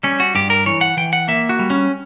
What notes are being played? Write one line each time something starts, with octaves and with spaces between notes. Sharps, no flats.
G3 C#4
F#4
G2 G4
A#4
E3 C#5
F#5
E3 G5
F#5
A#3 E5
F#4
G3
C#4